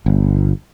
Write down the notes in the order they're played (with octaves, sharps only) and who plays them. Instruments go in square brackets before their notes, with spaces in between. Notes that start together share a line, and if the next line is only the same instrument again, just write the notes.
[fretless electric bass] G1